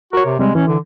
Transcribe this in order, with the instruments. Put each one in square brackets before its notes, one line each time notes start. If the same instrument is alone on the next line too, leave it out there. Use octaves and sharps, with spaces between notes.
[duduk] F#4 [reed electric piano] A#4 C#5
[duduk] C3
[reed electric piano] C3 G3 C4 [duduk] G#3
[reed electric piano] E3 [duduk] C#4
[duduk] D3